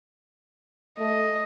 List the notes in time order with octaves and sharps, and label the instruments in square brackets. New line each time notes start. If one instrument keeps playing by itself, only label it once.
[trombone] A3 [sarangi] D#5